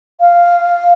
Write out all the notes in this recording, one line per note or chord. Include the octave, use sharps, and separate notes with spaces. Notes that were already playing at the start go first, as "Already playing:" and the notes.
F5